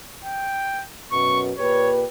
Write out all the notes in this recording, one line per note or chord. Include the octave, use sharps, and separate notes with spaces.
G5
F#2 B2 C#6
A#2 G4 B4 C#5